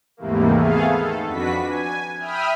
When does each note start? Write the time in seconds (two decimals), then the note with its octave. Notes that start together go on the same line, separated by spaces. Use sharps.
0.17 D#2 G#2 C3 E3 A3 A#3
0.55 A3 B3 G#4 A4 F5
0.91 D#3 A4
1.26 F2 D4 F#4 B4 B6
1.64 G#5
2.19 E5 G5 B5 D#6 F6